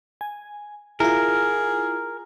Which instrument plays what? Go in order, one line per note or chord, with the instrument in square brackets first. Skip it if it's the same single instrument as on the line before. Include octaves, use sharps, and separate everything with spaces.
[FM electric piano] G#5
[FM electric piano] E4 F4 [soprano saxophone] G#4 [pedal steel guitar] A#4